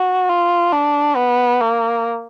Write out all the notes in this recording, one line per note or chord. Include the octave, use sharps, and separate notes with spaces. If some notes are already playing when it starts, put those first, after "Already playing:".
Already playing: F#4
F4
D4
B3
A#3